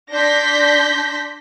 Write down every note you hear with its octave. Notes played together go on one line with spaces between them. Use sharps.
D4 C6 G6 A#6 B6